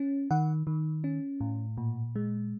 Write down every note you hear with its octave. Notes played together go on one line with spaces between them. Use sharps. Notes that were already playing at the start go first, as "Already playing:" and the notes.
Already playing: C#4
D#3 F#5
D#3
C#4
A2
A#2
G#3